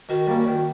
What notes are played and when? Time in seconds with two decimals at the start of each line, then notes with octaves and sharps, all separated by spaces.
0.09 D#3 F#4
0.27 G3 A#3 C#4
0.47 D#3